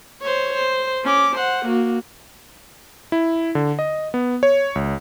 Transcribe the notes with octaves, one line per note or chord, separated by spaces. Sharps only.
C5 C#5
C5
C#4 D6
C5 F#5
A#3 F#4
E4
D3
D#5
B3
C#5
C#2